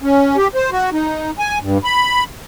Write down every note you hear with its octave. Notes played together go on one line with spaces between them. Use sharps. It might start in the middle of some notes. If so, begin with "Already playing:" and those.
C#4
G4
C5
F#4
D#4
G#5
G2
B5